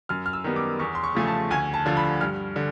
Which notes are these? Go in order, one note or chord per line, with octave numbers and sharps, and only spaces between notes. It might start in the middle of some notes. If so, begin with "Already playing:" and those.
F#2 F6
F6
E6
D#3 G3 B3
D6
E2 C#6
C6
C#6
C#3 F3 A3 G#5
A5
D2 G#5
A5
D3 F3
B5
G2 F6
D3